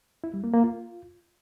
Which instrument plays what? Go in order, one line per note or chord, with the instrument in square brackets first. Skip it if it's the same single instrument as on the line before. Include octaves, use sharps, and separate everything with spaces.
[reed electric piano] E4
G3
A#3
A#3
F4